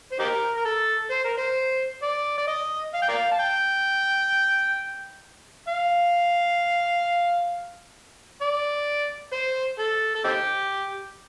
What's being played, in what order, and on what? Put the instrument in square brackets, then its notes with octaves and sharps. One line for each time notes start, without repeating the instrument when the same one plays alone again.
[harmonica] C5
D#4 G4 A#4
A#4
A4
C5
A#4
C5
D5
D5
D#5
F5
G5
A#4 D5 F5
A5
G5
F5
D5
C5
A4
A4
C4 D#4 G4